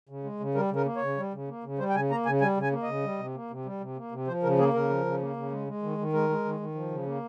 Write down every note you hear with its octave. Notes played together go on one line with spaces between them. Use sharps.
C#3
G#3
C#3
G3 A#4
C#3 A#4
A#3
C#5
C#3
G3
C#3
A#3
C#3
G3 C5
G5
C#3 G#5
A#3 A#5
C#3 G#5
G3 G#5
C#3
G#5
A#3
C#3 D#5
G3
C3
A#3
C3
G3
C3
A#3
C3
F3 C5
C#3 A#4
A#3 G#4
C#3 A#4
F3
C#3
A#3
C#3
G#3
G#3
D#3
D#3
G#3 A#4
G#3
D#3
D#3
F3
C#3
A#3